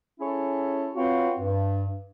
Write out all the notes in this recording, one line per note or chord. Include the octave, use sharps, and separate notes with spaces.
C#4 E4 G#4 A4 C#5
C4 F4 F#4 B4 C#5
G2